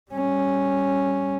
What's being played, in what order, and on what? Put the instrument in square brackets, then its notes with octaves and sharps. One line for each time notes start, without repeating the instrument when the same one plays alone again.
[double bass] G3 C#4